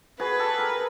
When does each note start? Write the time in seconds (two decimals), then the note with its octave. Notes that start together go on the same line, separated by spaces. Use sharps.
0.19 F#4 G#4 B4
0.39 G4 A4
0.58 G#4 A#4